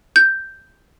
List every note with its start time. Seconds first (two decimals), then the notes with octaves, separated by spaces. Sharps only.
0.16 G6